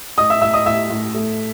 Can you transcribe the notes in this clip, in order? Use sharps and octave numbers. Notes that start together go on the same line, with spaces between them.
A2 D#5 D#6
E5 E6
A2 E5 E6
D#5 D#6
A2 E5 E6
A2
A3